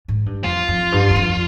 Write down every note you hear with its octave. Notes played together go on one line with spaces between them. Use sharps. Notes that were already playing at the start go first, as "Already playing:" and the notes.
G#2
G2
F2 F4
F2
G2
G2
F2